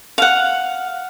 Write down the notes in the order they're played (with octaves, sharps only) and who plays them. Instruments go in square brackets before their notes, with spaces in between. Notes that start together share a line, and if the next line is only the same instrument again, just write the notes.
[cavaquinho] F5 F#5